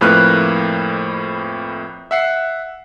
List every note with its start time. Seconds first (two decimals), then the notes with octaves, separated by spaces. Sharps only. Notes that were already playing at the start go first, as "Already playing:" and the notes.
0.01 F2 A2 A#3 B4 F6 F#6
2.11 E5 F#5 C7